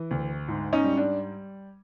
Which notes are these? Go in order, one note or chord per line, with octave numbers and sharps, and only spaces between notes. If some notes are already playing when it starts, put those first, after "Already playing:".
Already playing: E3
D2
G#2
C#4 D#4
G3
D4